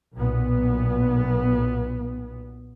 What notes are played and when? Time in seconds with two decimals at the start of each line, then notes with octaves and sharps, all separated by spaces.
0.16 B1 A#2 B3